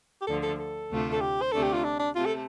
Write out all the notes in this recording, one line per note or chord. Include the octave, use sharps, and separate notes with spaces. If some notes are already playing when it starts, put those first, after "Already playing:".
G4
D2 D3 F3 A4
A4
A4
D2 C3 A3 D4 F4
A4
G4
C5
D2 C3 A3 D4 A4
G4
F4
D4
D4
C3 A3 F4
A4